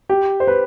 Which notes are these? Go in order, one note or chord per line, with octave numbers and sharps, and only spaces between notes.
G4
C5
B4